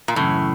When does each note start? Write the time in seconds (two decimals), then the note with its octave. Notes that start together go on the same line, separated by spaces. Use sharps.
0.08 A#2
0.16 F#2 A2 C#3 E3